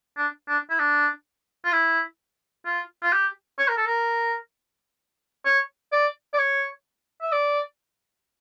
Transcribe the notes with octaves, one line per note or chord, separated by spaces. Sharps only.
D4
D4
E4
D4
F4
E4
F4
F4
G4
C#5
A#4
A4
A#4
C#5
D5
D5
C#5
E5
D5